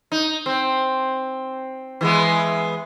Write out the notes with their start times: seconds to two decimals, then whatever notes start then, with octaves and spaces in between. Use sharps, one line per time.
0.12 D#4
0.46 C4
2.01 E3 G#3 B3